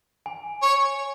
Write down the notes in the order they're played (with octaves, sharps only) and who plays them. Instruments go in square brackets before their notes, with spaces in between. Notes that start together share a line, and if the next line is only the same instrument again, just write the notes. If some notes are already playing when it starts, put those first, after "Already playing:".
[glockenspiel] G#5
[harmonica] C#5